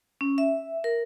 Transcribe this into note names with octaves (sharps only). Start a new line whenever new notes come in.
C#4
E5
A#4